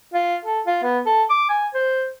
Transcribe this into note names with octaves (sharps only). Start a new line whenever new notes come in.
F4
A4
F4
B3
A4
D6
G#5
C5